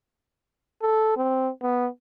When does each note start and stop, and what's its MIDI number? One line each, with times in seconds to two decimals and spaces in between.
0.82 1.14 69
1.17 1.49 60
1.62 1.87 59